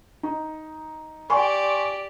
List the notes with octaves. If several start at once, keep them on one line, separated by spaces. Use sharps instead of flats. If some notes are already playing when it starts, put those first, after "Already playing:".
D#4
G4 D5 G#5 C6 C#6